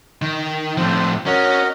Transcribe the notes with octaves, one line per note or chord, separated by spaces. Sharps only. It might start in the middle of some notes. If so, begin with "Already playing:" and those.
D#3
A2 F3 C4
C#4 F#4 A#4 D#5